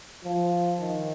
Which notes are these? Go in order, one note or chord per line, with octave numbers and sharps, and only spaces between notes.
F3
D#3